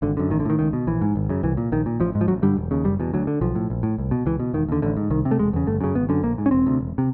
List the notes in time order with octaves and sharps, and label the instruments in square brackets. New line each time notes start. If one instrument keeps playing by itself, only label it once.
[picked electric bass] G#1 D3
F#2 D3
A1 D#3
D3
A2 D#3
C#2 D#3
B2
A#1 E3
G#2
G#1
F#2 C#3
C2 E3
A#2
A#1 D#3
A#2
A1 F3
G#2
F3
A1 F#3
G2 D3 G3
E1
D#2 C#3
F#1 G3
E2 B2
D2 F#3
D3
B1 F3
A2
A#1
A2
C2
B2
C#2 E3
B2
E1 D#3
D#2 D3
A1 D3
G#2
C2 D#3
C3
A3
E1 G#3
E2 C#3
G1 A3
F#2 C#3
G#1 B3
F#2 D3
A#1 A#3
G#2
C#4
E1 C4
D2 C3
E1
C3